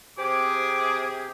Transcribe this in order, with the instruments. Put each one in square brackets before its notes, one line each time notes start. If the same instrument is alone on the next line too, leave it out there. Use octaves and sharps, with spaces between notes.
[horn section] C3 G#4 [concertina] G4 [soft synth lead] C5 [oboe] D6